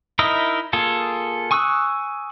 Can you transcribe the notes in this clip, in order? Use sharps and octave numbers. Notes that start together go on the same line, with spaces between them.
D#4 E4 A#4 D#5 E5
A#3 F4 G#4 A4
G#5 C#6 D#6 E6 F#6